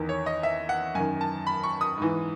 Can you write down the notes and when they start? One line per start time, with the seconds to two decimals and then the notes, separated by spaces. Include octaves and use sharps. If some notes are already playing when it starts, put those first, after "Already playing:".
Already playing: E2 D#3
0.09 C#5
0.26 D#5
0.43 E5
0.69 F#5
0.95 F#2 G#5
0.99 D#3
1.21 A5
1.47 B5
1.63 C#6
1.81 D#6
1.98 G#2 E3